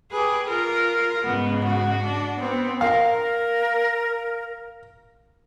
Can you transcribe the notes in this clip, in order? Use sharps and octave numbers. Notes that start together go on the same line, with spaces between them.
G4 G#4 B4
F4 A#4
G#2 C#3 B3
F#4
D4
B3 C4
A#4 F5